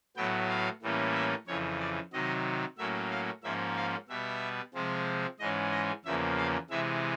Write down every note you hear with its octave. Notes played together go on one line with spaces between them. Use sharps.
A2 F#3 B3 G5
F5
A2 E3 G3 A#3 C#4
E5
F2 C#3 E3 C#5
D5
C3 D#3 F#3 D#5
A2 F#3 A#3 C#4 E5
F5
G#2 F3 A#3 C#4 E5
F5
B2 G3 B3 E5
C3 F3 G#3 C4
G#2 E3 G#3 C#4 D#5
D#5
E2 C#3 F3 A#3 E5
F5
C3 E3 G#3 E5